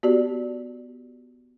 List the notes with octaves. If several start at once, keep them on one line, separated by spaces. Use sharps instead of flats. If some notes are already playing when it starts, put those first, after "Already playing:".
B3 F#4 G4 D5